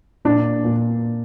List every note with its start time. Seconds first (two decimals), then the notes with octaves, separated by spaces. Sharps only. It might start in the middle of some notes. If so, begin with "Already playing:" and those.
0.25 A#2 D4
0.64 A#2